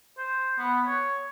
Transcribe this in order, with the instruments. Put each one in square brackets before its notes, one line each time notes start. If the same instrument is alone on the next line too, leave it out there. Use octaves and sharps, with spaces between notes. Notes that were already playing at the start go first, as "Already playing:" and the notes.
[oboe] C5
B3
C#5